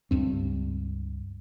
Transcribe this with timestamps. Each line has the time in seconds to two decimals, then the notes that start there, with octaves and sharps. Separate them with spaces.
0.11 C#2 G2 C4